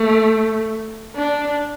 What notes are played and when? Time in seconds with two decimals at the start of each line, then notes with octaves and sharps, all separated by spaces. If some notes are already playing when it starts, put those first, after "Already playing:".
Already playing: A3
1.16 D4